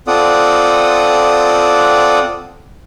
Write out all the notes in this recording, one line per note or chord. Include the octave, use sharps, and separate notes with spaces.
C4 F4 A4 D5 F#5 D#6